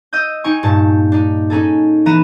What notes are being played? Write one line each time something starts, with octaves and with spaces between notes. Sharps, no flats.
D#5 D#6 E6 G6
D#4 G5 G#5 C#6
G2 A#2 A5
D4 D#4
C#4 D#4 G#4 A4
E3 B3 A#5 D#7 E7